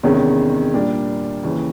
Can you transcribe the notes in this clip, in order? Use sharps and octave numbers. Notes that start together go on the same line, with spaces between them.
E2 C3 D#3 G#3 C#4
A#2 G3 A#3 D4
D#2 C#3 E3